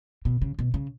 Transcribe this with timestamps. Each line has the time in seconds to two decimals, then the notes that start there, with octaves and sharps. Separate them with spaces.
0.25 B2
0.42 C#3
0.59 B2
0.74 C#3